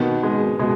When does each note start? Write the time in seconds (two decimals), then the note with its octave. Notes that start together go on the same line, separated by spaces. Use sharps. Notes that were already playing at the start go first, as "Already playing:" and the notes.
Already playing: B2 D#3 B3
0.23 G#3
0.59 B2 G#3